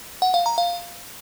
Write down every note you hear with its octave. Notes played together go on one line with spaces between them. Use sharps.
F#5
F5
A#5
F5